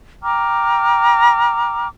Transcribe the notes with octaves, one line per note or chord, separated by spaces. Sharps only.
G5 A#5 D6 F6